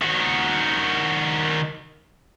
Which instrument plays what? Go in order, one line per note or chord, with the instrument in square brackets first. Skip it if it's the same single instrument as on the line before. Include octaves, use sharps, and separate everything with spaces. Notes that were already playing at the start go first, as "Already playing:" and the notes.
[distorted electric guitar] D#3 F#4